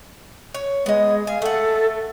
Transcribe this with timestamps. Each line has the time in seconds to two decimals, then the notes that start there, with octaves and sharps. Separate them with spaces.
0.54 C#5
0.86 G#3 B3 D#5
1.27 F5 G#5
1.42 A3 A4 F#5